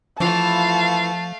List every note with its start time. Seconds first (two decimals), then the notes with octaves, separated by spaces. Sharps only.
0.20 E3 F3 A3 E4 F4 F5 A5